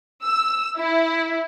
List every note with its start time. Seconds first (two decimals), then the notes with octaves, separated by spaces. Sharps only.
0.24 E6
0.78 E4